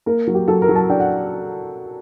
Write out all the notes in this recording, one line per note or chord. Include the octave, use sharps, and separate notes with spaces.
A#3 A#4
F#3
G4
F#3 A4
A#4
F#3
A5
D4 G5
F#5